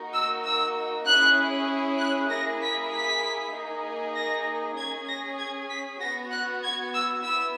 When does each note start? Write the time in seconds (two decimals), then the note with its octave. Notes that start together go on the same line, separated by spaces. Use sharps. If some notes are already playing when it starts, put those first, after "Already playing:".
Already playing: A#3 D#4 F#4
0.14 E6
0.45 E6
1.06 C#4 E4 G#4 F#6
1.99 F#6
2.30 A#3 E4 G#4 A#6
2.61 B6
2.92 B6
3.53 A#3 D#4 G#4
4.14 A#6
4.76 C#4 G#4 G#6
5.08 A#6
5.38 G#6
5.69 B6
6.00 B3 F#4 A#6
6.31 F#6
6.63 G#6
6.93 E6
7.23 B3 E4 E6